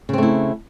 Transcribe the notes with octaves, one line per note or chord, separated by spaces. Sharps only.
C#3 A3 C4 E4